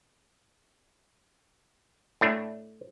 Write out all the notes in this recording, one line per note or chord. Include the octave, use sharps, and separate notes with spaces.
A2 A3 D4